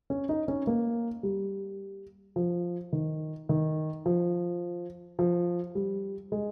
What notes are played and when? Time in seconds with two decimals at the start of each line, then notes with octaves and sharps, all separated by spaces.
0.10 C#4
0.29 D#4
0.48 C#4
0.67 A#3
1.23 G3
2.36 F3
2.92 D#3
3.49 D#3
4.06 F3
5.19 F3
5.75 G3
6.32 G#3